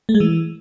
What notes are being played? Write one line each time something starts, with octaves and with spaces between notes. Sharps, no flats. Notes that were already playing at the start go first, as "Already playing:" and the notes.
A3
G#3
E3